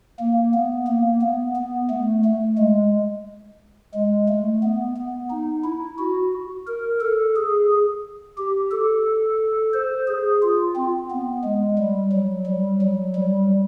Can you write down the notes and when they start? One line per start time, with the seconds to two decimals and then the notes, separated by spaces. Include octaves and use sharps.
0.19 A#3
0.54 B3
0.87 A#3
1.21 B3
1.56 B3
1.89 A3
2.24 A3
2.58 G#3
3.94 G#3
4.28 A3
4.63 B3
4.97 B3
5.30 D#4
5.64 E4
5.98 F#4
6.67 A#4
7.01 A4
7.36 G#4
8.38 G4
8.71 A4
9.73 C5
10.08 G#4
10.43 F4
10.76 C4
11.11 B3
11.44 G#3
11.78 G3
12.12 F#3
12.46 G3
12.81 F#3
13.15 G3